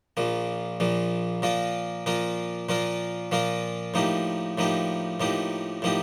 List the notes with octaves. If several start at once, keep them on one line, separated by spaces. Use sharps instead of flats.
A#1 A#2 F3 A#3
A#1 A#2 F3 A#3
A#2 F3 A#3 F4 A#4
A#2 F3 A#3 F4 A#4
A#2 F3 A#3 F4 A#4
A#2 F3 A#3 F4 A#4
A2 F3 A#3 D#4 G4
A2 F3 A#3 D#4 G4
A2 F3 A#3 D#4 G4
A2 F3 A#3 D#4 G4